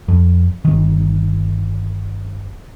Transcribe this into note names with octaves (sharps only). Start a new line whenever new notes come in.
F2
G1 D#3